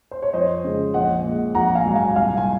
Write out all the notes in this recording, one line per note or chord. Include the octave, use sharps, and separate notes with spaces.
C5
C#5
F2 C5 D#5
C#3 G#3
A#1 D#5 F#5
A#2 G#3
A#1 F#5 A#5
F5 G#5
G#2 F#3
F5 G#5
C2 F5 G#5
G#5